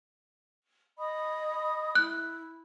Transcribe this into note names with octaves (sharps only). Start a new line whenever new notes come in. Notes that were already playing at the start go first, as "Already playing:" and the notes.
D#5 B5 D#6
E4 F#6